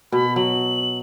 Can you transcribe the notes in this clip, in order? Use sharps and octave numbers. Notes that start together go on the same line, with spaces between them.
B2 B5
F#3 F#7